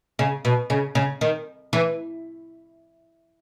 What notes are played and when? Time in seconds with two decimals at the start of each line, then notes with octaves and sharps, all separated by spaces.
0.19 C#3
0.45 B2
0.70 C#3
0.95 C#3
1.21 D#3
1.73 E3